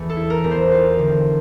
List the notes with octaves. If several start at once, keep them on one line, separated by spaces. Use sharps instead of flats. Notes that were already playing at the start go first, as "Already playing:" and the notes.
Already playing: E2 E3 A3
A4
E4
A#4
E2
C5
F4
D3